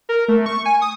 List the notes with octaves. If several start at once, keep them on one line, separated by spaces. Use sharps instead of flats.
A#4
A3
C#6
G#5
D#6